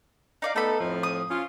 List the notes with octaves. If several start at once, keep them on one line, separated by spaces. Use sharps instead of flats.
D#4 D5 F5
A3 B3 D#4 A4 B5
F2 A2 F3
D#6
C#4 F4